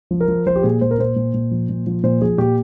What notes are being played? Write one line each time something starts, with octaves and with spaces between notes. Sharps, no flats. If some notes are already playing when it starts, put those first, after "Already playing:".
F3
A#4
F3
F3 C5
G4
A#2 G#4
A#2 C5
A#4
A#2 C5
A#2
A#2
F3
A#2
F3
A#2 C5
F3 G#4
A#2 G4